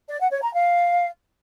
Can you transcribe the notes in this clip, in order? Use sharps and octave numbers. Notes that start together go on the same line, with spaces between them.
D5
F#5
C#5
A#5
F5